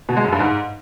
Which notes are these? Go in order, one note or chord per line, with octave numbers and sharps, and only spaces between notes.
B2
G#3
F#2
G2
G#2